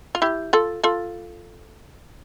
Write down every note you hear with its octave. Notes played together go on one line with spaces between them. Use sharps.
F4
E4 G4
F4 A4
F4 A4